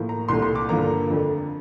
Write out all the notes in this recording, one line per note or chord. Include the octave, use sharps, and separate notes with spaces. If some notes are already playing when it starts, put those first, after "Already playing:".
Already playing: A2 F3 A#3
A#5
C2 A#2 A3 C6
C6
D6
G2 D3 F3 A#3 A#5
F2 D3 A3